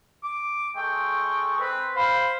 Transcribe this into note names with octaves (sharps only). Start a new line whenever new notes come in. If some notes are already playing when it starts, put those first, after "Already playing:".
D6
G#3 A4 G5 C#6
C4 B4
C5 F5 B5